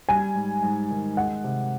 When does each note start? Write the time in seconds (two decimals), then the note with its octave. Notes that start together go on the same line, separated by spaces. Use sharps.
0.09 G3 G#5
0.35 G#2
0.63 G#2
0.91 D#3
1.17 G#3 F#5
1.44 C3